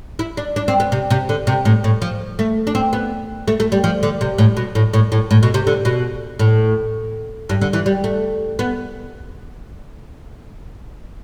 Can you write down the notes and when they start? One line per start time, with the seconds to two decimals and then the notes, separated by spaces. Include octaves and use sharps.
0.19 E4
0.37 D4
0.56 D4
0.68 C4
0.80 B3
0.92 C3
1.10 C3
1.29 D3
1.47 C3
1.65 A2
1.84 A2
2.02 F3
2.39 A3
2.67 D4
2.75 C4
2.93 B3
3.48 A3
3.60 A3
3.72 G3
3.84 F3
4.03 D3
4.21 C3
4.38 A2
4.57 B2
4.75 A2
4.93 A2
5.12 A2
5.31 A2
5.43 B2
5.54 C3
5.67 D3
5.85 B2
6.39 A2
7.49 G2
7.61 D3
7.73 E3
7.86 G3
8.04 A3
8.59 B3